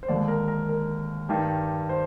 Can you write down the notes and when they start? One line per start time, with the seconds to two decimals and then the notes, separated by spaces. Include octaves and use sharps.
0.03 C5
0.08 D#2 D3 G#3 D5
0.28 A#4
0.48 A#4
0.69 A#4
1.29 G2 D#3 G3
1.89 C5